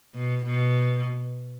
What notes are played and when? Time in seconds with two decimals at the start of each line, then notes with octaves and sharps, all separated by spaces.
0.15 B2
0.46 B2